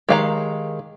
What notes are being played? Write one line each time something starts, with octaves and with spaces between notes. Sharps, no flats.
D#3 G#3 G4 F5 A#5